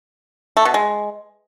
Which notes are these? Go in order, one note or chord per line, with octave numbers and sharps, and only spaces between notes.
A3
B2
G#3